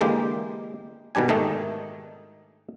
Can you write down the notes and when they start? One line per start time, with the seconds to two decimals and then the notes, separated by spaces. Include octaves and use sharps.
0.01 D3 E3 G#3 A#3 G4
1.15 B2 D#3 G3 D4 G#5
1.28 G#2 D#3 A3 D#4